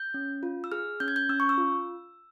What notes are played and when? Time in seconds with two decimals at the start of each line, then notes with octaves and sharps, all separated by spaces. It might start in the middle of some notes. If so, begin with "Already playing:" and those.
Already playing: G6
0.14 C#4
0.43 F4
0.64 E6
0.72 G#4 F6
1.00 C#4 G6
1.08 G#6
1.16 G6
1.29 C#4 E6
1.40 C#6
1.49 E6
1.58 F4